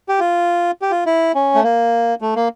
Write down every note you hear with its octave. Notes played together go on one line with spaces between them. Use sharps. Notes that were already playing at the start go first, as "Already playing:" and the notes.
G4
F4
G4
F4
E4
C#4
A3
A#3
A3
A#3